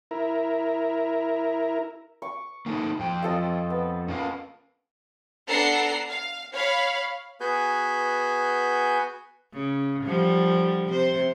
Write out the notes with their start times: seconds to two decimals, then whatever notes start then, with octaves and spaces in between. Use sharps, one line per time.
0.11 E4 A#4
2.22 C#6 D6
2.66 A#3 D#4 A4
2.99 F2 G5
3.23 F4 A4 D#5
3.70 B3
4.08 C#4 A#4 F5
5.49 B3 D4 A4 F#5 A#5 C7
6.09 F5
6.54 C#5 F5 B5
7.40 B3 F#4 G#4 B4 G#5 G6
9.53 C#3
10.04 D3 F3 G3
10.88 C3 C5